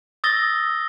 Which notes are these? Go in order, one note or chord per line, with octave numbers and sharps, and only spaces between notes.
D#6 E6 A6 A#6 G7